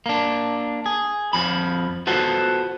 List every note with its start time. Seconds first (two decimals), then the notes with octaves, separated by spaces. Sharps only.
0.06 A#3 D4
0.86 G#4
1.33 F2 F3 B5
2.07 B3 F4 F#4 A4 C5 F#5